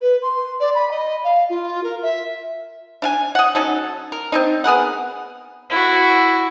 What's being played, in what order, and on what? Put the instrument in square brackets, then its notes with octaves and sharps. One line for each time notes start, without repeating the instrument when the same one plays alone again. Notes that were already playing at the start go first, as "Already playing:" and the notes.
[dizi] B4
C6
D5
B5
D#5
F5
F4
A#4
E5
[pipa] D4 F5 G#5
D#5 F#5
F#3 C#4 D#4 A4
A#4
C4 D4 D#4
B3 G#4 A#4 F#5
[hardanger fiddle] E4 F#4